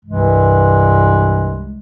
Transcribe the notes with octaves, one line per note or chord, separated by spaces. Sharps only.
C2 G2 C3 E3 G#3